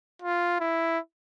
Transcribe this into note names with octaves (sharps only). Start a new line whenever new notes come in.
F4
E4